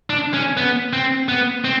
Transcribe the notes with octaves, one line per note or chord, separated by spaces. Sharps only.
D4
C#4
B3
C4
B3
C4